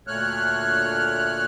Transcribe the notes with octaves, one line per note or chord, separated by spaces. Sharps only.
D2 A#2 A3 C#5 F6 F#6